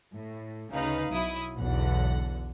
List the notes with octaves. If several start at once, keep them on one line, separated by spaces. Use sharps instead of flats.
A2
D2 C#3 D#4 B4 F5
B1 F#3 E4 D#6
B1 E2 D3 F#5